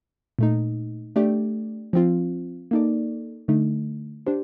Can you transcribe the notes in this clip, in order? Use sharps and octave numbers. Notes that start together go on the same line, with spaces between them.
A#2 A3 D#4
A3 D4 G4 D5
F3 C4 F4
A#3 D#4 A4 D5
D3 A3 D#4
D4 G4 C5